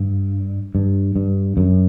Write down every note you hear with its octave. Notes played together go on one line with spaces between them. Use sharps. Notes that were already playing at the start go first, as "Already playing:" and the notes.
Already playing: G2
G2
G2
F#2